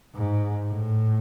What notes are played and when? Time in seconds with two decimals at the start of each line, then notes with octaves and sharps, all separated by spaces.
0.15 G#2
0.69 A2